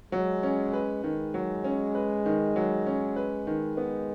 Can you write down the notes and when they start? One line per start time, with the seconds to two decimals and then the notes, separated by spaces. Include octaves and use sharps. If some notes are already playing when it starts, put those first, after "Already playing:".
0.12 F#3 G#3
0.43 C#4
0.73 B4
1.04 D#3 G#3
1.34 F#3
1.64 C#4
1.95 B4
2.26 D#3
2.56 F#3
2.86 C#4
3.16 B4
3.47 D#3
3.77 G#3 B3